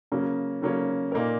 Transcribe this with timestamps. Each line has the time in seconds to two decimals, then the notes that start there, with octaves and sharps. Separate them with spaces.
0.12 C#3 F#3 A#3 C#4
0.62 C#3 F#3 A#3 C#4
1.12 A#2 A#3 D#4 A#4